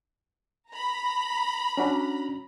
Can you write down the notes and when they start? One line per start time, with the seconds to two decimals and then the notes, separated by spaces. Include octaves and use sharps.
0.71 A#5 B5
1.77 C#4 D4 F#4